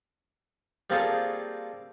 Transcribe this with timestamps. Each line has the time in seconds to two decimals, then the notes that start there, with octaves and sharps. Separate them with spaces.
0.90 G3 A#3 C4 F4 G#4 A4